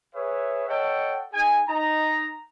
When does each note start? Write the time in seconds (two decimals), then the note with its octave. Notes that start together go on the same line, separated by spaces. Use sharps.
0.15 G#4 B4 C#5 E5
0.68 A4 C#5 D#5 F#5 G5
1.33 D#4 G#4 G#5
1.68 D#4 A#5